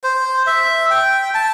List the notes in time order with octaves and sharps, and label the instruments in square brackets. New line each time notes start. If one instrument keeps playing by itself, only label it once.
[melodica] C5
E5
G5
A5